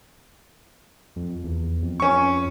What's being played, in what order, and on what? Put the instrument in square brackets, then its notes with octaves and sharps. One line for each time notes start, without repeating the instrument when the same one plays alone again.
[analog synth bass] F2
E2
F2
[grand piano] C#4 C#6